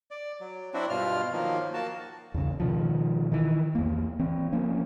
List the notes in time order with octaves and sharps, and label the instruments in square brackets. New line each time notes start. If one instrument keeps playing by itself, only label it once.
[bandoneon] D5
F#3
F#3 C4 D4 E4 F#4
G2 B2 F4 F6
D#3 F3 F#3 A#3
A#3 F#4 A5
[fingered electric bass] E2 C#3
B2 D#3 F3
D#3 E3
E2 A#3
E3 C4
F3 A#3 C#4